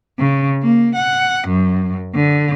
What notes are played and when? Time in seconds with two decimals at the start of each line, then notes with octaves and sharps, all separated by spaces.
0.18 C#3
0.62 A#3
0.95 F#5
1.47 F#2
2.14 D3